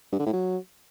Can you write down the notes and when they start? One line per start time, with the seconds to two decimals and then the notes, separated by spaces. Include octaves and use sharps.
0.12 G2
0.19 D3
0.26 A2
0.33 F#3